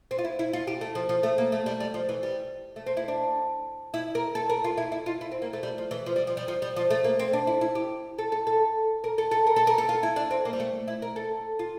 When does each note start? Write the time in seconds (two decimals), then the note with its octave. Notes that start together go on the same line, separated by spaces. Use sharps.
0.11 C4
0.18 F4
0.25 E4
0.39 E4
0.53 F4
0.67 G4
0.81 A3
0.95 F3
1.09 F3
1.23 A3
1.38 A#3
1.52 A3
1.66 G3
1.80 G3
1.94 F3
2.09 E3
2.23 G3
2.76 A3
2.86 C4
2.97 E4
3.08 D4
3.94 E4
4.15 A#4
4.35 A4
4.49 A#4
4.64 F4
4.78 E4
4.92 E4
5.06 F4
5.21 E4
5.31 C4
5.42 A#3
5.53 A3
5.63 G3
5.78 F3
5.91 E3
6.06 F3
6.16 G3
6.27 F3
6.37 G3
6.48 F3
6.62 G3
6.76 F3
6.90 A3
7.04 A#3
7.19 C4
7.33 D4
7.47 E4
7.61 E4
7.75 G4
8.18 A4
8.32 A4
8.47 A4
9.04 A#4
9.18 A4
9.31 A4
9.47 A#4
9.56 A4
9.67 A#4
9.78 A4
9.89 F4
10.03 E4
10.16 D4
10.31 C4
10.45 A#3
10.53 G3
10.60 A3
10.88 E4
11.02 A#4
11.16 A4
11.59 F4